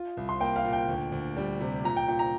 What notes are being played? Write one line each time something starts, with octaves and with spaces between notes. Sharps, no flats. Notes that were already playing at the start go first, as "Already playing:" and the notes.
Already playing: F4
C2
C6
A#3 G5
F5
A#2
G5
D2
D2
G3
C3
A#2 A#5
G5
A#2 G5
A#5